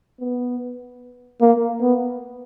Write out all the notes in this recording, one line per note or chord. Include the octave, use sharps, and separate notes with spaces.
B3
A#3
B3